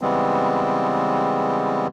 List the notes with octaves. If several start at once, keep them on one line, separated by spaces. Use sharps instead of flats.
C#3 E3 G3 G#3 B3 C4